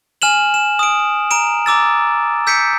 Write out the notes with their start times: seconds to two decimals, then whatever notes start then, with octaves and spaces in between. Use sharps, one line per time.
0.22 G#5 F6 E7 F#7
0.54 E7
0.79 D#6 D7
1.31 A#5 D7 E7
1.66 A#5 D6 E6 A6
2.47 E6 G6 B6 C#7 D7